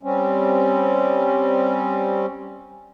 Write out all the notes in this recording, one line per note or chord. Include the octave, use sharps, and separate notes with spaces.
G3 C4 C#4